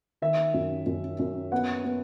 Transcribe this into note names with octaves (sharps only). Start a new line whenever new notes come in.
D#3 E5
F#2
F#2
F#2
B3 F#5
B3